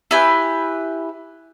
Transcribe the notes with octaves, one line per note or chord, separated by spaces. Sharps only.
E4 G4 B4 G#5